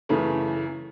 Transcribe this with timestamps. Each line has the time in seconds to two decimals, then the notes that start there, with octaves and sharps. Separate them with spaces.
0.09 F#2 C#3 E3 A3